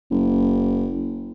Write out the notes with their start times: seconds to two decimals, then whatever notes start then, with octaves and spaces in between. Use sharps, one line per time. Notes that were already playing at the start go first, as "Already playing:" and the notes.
0.11 F#1